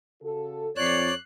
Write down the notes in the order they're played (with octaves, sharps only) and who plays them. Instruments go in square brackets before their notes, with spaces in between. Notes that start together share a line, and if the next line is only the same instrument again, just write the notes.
[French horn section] C#3 F#4 A4
[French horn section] F2 [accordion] C#5 D5 [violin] F#6 C7